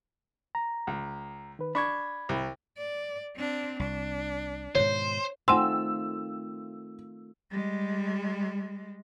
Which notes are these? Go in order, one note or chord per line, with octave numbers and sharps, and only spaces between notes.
A#5
C#2
D#3 B4
D4 B5 C#6 G#6
C2
D5
C4 D4
C2 D4
G#2 B2 D#3 C5 C#5
D#3 A3 C4 F4 F#5 G#5 C6 E6
G3 G#3